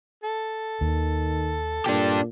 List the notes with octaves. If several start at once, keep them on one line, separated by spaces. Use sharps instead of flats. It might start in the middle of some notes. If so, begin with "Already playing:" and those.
A4
D#2 D#3
A#2 D4 G4